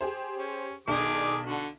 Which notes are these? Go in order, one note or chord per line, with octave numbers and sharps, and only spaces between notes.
G4 G#4 C5
C#4
B1 D#3 D4 G#4 D6
D3 F#4